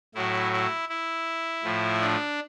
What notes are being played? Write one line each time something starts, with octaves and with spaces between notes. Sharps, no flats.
A2 F#3 E4
E4
E4
A2 F3
D4